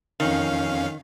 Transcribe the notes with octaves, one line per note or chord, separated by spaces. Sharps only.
F2 D#3 C#4 F5